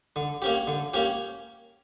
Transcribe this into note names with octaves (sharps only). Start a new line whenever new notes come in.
D3
A#3 C#4 G4
D3
A#3 C#4 G4